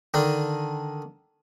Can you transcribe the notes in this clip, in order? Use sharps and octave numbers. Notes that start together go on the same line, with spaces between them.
D3 D#3 D4